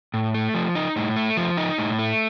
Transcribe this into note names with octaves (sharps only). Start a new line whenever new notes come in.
A2
A3
F3
D#4
A2
A3
F3
D#4
A2
A3